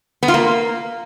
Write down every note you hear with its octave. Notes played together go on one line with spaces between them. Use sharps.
B3
F4
A#3